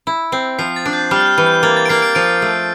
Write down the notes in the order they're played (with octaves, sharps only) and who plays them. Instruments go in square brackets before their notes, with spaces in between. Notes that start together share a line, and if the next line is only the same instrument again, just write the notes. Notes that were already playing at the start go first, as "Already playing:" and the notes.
[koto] E4
C4
[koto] F3 [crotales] C7
[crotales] A6
[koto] D4
[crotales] G6
[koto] G3 [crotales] F6
[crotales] G6
F6
[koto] E3
[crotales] G6
[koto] A#3 [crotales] A6
[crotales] A6
D7
[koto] A#3 [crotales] C7
[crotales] D7
[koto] F3 [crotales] D7
[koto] A3